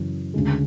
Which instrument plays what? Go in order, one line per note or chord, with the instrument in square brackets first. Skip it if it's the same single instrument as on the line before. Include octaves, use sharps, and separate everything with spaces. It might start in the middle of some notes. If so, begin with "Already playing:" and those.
Already playing: [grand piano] F#2 C#3 E3
D2 C#3 G#3